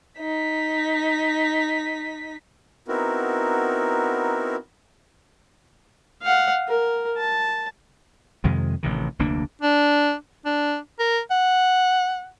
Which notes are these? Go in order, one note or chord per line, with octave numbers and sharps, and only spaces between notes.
D#4 B6
B3 C4 D#4 E4 F#4 A#4
F5 F#5
A#4
A5
F2 C3 D#3 G#3
A1 C3 D#3
F1 D2 A#3 D4
D4
D4
A#4
F#5